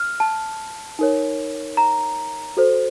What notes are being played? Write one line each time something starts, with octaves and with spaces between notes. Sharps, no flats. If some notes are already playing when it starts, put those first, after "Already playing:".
Already playing: F6
A5
D#4 A#4 C#5
A#5
F#4 A4 C5